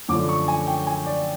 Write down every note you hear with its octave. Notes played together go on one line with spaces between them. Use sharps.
F#2 D3 F3 A3 D4 D6
C#6
G#5
G5
G#5
D5